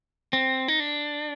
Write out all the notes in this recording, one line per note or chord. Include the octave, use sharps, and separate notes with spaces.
C4
D#4
D4